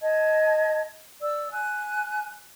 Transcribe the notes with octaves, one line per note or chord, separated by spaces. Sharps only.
D#5 A5 G#6
D5 E6
G#5 F#6